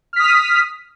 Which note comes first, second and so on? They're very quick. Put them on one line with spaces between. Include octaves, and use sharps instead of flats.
F6 B6 D#6